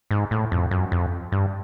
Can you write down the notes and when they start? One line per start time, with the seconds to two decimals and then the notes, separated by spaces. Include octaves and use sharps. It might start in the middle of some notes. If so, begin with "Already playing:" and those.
0.11 G#2
0.31 A2
0.52 F2
0.71 F#2
0.92 F2
1.32 G2